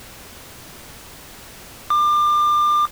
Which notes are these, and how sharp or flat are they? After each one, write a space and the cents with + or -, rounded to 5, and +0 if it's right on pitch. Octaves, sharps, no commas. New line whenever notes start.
D6 +30